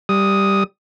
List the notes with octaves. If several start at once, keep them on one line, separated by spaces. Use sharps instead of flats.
G3 D#6